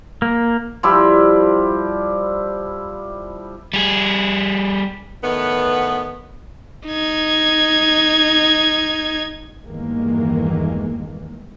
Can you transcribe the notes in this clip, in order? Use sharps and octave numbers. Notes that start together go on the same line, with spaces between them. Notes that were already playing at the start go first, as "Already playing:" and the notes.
A#3
F3 G3 E4 G4
G3 G#4
A2 D#3 B3
D#4 G#6
E2 G2 D#3 E3 G#3 A#3